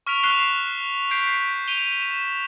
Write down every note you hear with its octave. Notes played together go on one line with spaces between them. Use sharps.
C#6 F6 B6 D7 F7
C#6 F#6 C7 E7 F7 G7
G6 B6 C7 D7
D7 D#7 F7 G7
E7